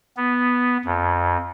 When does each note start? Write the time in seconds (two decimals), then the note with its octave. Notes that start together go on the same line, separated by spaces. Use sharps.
0.17 B3
0.85 F2